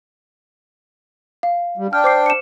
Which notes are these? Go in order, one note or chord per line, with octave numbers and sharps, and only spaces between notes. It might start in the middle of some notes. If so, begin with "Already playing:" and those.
F5
G3
D4 G5 F6
C5 D6 C7
C#7 E7